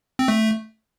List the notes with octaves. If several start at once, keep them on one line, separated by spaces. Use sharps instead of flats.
C4
A3